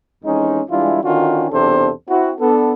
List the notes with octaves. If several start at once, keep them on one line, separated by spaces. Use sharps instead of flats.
F2 E3 G#3 C#4 D#4
E3 G3 G#3 D4 E4 F4
D3 D#3 C#4 D4 F4 F#4
B1 E2 C3 D4 A4 C5
C4 E4 F#4
B3 D4 A4